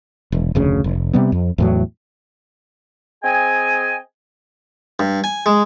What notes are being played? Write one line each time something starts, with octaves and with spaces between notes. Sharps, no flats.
E1
F1 D2 C#3
F1
C3 G3 B3
F2
E2 A2 F#3
C4 G#4 D#5 G5 G#5
G2
G#5
G#3